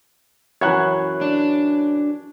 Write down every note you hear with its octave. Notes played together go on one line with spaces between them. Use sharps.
F#2 E3 C#5 B5 C#6 F#6 G#6
D4